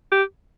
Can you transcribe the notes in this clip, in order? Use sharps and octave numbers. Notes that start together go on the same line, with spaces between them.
G4